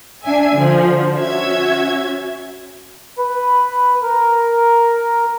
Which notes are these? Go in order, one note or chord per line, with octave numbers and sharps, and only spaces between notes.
D4 E5 G#5
D3 F3
C#4 F#4 E5 G#6
B4
A#4